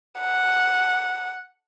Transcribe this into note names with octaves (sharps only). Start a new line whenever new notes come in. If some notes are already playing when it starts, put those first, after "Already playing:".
F#5